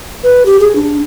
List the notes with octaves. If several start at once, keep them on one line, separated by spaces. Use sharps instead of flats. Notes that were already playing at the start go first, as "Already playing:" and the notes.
B4
G4
G#4
D4